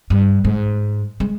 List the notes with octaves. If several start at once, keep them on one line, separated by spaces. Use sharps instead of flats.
G2
G#2
G#3